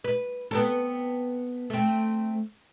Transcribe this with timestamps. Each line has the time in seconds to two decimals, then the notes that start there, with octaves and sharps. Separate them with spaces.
0.04 B4
0.51 B3 C4 A4
1.70 A3 C4